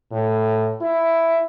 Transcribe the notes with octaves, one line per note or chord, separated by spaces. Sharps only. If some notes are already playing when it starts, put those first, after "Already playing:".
A2
E4